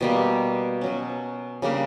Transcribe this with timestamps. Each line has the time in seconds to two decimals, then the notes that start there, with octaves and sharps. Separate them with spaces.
0.01 B2 G3 A#3
0.81 B2 F#3 C#4
1.62 C#3 G3 A#3 D4